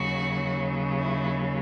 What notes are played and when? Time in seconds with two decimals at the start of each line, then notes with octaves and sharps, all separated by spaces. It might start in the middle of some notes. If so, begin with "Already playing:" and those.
Already playing: D#2 C#3 F#3 F#4
1.00 E4